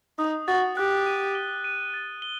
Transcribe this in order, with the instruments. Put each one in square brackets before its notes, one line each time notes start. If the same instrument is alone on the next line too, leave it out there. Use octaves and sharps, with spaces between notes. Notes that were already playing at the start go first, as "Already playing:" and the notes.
[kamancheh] D#4 [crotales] D#6
[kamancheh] F#4 [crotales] A6
[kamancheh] G4 [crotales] F#6
[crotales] D#7
G7
D#7
A6
G7